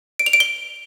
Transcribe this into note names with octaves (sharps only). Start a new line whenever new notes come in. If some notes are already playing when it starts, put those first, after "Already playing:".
D7
F7
D7
G7